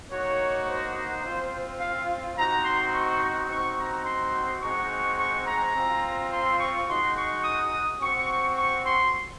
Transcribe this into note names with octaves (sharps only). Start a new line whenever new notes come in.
A#3 D#4 F#4 C#5
C5
C4 F4
F5
C4 D#4 F#4 A#5
C6
C#6
C4 D#4 F#4 C#6
A#5
C6
G#3 C4 D#4 F#4 C#6
C#6
A#5
C4 F4
C6
C#6
G#3 D#4 F#4 C6
C#6
D#6
C4 F#4 C#6
C#6
C6